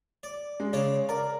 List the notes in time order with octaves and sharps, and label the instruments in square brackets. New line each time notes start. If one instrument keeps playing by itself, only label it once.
[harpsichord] D5
[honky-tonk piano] G#3
[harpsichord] C#3 C#4 D5
[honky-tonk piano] A#4 [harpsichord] D5